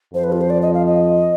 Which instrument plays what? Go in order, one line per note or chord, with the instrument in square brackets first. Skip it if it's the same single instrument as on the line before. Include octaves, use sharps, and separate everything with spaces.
[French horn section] F2 F3 [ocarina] C5
[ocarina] B4
F4
C5
D5
D#5
F5
D#5